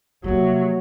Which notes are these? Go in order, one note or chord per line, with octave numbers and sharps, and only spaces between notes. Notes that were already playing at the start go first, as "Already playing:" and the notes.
C3 F3 F#3 A#3